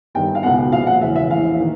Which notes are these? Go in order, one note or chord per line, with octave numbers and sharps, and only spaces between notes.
G1 G2 D#3 G5
F5
C#2 B2 F#5
A#1 A#2 F5
F#5
E1 E2 C#3 E3 E5
E5
A#1 A2 E3 F5
D#3